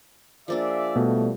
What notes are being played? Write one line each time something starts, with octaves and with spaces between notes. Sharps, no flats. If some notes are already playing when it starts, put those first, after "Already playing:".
F3 A#3 D4 G#4 D5 E5
B2 G3 A3